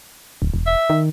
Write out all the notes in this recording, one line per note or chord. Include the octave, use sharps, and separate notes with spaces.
D1
E1
E5
D#3